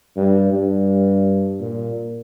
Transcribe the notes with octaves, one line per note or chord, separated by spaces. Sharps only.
G2
G2
A#2